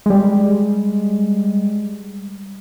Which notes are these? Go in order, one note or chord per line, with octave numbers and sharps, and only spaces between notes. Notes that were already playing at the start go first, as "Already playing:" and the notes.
G3 G#3